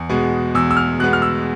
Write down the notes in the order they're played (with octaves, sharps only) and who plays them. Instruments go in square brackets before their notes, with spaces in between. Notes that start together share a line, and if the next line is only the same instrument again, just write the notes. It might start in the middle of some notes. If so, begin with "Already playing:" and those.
Already playing: [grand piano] E2
B2 G#3 B3
E2 E6
E6
F6
B2 G#3 B3 F#6
F6
E6